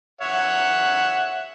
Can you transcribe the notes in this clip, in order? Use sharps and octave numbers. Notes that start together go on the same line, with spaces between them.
C#5 E5 F#5